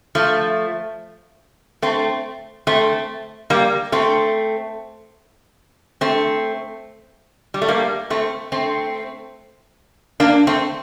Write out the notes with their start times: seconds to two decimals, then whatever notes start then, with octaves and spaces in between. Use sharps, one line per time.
0.15 F3 A3
1.82 A3 C4
2.67 A3 C4
3.50 G3 A#3
3.92 A3 C4
6.01 A3 C4
7.54 G3
7.62 A3
7.68 G3 A#3
8.10 A3 C4
8.52 A3 C4
10.20 A#3 D4
10.47 A3 C4